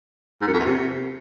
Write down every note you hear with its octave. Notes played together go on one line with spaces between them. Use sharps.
G#2
F#2
F2
E2
C3